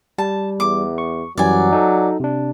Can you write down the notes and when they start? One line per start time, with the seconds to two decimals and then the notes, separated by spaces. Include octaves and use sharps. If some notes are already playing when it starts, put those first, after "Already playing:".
0.18 G3 A5
0.60 E2 D6
0.98 C#6
1.38 F#2 E3 F#3 G3 D5 G#5
1.72 D#4 A4
2.20 C3 D4